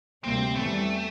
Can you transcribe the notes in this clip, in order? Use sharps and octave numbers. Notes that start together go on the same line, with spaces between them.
D2 C3 G3 A#3 C4
E2 E3 G3 A3 C4